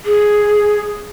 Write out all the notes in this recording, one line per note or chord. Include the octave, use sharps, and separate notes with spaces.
G#4